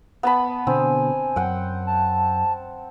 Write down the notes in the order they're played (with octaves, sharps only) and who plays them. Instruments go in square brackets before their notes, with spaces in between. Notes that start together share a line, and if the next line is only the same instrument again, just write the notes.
[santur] B3 A5 B5
[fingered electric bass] B2 D3 [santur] C4 [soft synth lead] G#5
[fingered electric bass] F#2 [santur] F#5 G5
[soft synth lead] A5